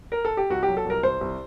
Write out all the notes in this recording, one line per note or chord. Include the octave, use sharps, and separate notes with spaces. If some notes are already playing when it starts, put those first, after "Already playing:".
A#4
A4
G4
C2 F#4
G4
F#3
A4
C2 A#4
C2 C5
C2